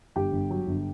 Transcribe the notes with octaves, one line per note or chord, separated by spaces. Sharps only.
G1 G4 G5
G1
F#3
G1